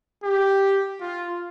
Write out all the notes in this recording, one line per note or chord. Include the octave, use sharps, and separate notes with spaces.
G4
F4